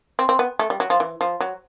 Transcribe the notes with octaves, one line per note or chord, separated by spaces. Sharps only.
C4
C4
B3
A3
G3
F#3
F3
E3
F3
F#3